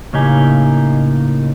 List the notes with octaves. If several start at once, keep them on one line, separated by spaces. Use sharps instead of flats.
A2 C#3 A#3 D#4 G4 G#5